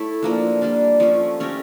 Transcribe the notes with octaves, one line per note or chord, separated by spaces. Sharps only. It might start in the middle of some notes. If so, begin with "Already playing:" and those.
Already playing: A3 E4 A4 C#5
F3 A#3 D4
G3 A#3 D4
F3 A3 C#4
A3 C#4 G4 A#4